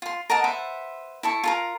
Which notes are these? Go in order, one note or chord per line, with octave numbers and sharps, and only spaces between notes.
F4 C6
A#4 D#5 F#5 A5
B4 C5 E5 F#5
E4 A4 C#6
F4 A4 A#4